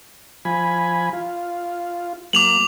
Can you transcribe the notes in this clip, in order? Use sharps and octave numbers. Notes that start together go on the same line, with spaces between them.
F3 G#5 B5
F4
F#3 A#3 D6 F7 F#7